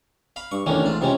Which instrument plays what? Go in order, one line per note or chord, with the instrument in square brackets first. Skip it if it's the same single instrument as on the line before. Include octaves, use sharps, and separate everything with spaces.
[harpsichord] F5 B5
[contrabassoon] G2 [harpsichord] C#6
[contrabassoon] F1 [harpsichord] D#3 A#3 C#4 [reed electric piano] E3 A3 D4
[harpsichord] A#1 G#2 F4
[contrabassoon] C#2 [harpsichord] C3 F3 C#4